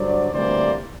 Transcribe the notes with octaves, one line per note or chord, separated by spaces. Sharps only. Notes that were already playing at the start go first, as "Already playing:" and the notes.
Already playing: G2 D3 F#3 C5 D5
D2 C3 E3 G3 A#3 C5 D5